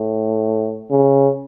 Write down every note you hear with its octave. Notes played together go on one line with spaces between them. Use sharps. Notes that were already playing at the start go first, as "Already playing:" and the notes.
Already playing: A2
C#3